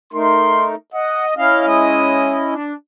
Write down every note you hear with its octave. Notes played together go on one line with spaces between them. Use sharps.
A3 D#4 A#4 C6
D#5 F#5
C#4 E4 D#5 F5
G#3 D#6
D4